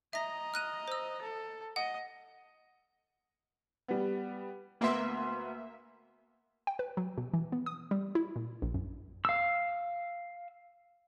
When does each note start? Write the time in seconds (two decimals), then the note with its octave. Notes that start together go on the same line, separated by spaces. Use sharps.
0.13 D#5 E5 A#5 A#6
0.54 F6 F#6 D#7
0.88 C5 E6
1.22 A4
1.76 D#5 F#5
3.88 G3 B3
4.81 D2 A#3 B3 E5 C6
6.67 G5
6.79 B4
6.97 F#3
7.18 B2
7.34 E3
7.52 B3
7.66 D#6
7.91 G3
8.15 E4
8.36 A#2
8.62 A#1
8.74 F#2
9.25 F5 E6